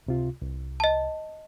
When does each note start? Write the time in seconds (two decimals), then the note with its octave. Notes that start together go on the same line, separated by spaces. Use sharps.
0.07 C#2 C3 F4
0.42 C2
0.80 D#5 A5